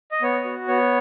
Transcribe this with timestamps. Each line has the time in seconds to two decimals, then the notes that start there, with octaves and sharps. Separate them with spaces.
0.12 D#5
0.22 B3 C#5
0.45 F#4
0.68 B3 C#5